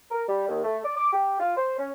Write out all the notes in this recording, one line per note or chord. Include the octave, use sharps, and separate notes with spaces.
A#4
G3
D#2
A3
D5
D6
G4
F4
C5
C#4